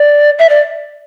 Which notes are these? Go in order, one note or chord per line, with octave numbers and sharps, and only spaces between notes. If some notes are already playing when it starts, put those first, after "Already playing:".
Already playing: D5
E5
D5